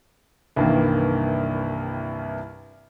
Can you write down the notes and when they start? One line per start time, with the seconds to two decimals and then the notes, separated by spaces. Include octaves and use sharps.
0.56 C2 G2 D#3 E3 A#3